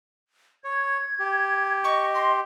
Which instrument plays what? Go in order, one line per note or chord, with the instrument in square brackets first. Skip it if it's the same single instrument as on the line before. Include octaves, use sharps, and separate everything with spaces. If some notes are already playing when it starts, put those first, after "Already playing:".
[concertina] C#5 [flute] G#6
[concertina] G4
[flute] D#5 [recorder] C#6
[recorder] C6